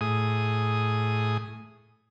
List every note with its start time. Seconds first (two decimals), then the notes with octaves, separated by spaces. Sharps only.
0.01 A2 G#4 D#6